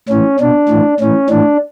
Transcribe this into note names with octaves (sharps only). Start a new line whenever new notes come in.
A2 E3 C#4
B2 D4
A2 E3
A2 E3 C#4
A2 E3 D4